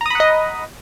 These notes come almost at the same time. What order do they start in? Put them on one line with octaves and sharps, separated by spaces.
A#5 D#6 B5 F#5 D#5